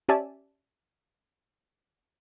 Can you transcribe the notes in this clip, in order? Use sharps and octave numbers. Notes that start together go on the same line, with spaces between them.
C#4 G4 D5 E5 G#5 A5